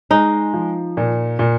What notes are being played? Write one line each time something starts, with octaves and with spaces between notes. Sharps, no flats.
G#3 D#4
F3
A#2
A#2